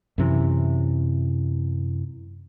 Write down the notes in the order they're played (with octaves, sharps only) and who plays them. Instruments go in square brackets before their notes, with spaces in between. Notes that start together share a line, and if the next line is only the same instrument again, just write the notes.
[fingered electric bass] F#2 C3 E3